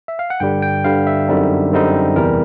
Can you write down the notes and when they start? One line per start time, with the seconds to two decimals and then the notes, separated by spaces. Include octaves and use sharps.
0.08 E5
0.19 F5
0.30 F#5
0.40 G2 D3 G3 G5
0.62 G5
0.84 G2 D3 G3 F5
1.07 E5
1.28 F#2 D3 G3 C4 D#4
1.72 F#2 D3 G3 C4 D#4
2.16 E2 C3 E3 G3 A#4